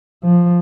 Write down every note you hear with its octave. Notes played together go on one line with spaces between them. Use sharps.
F3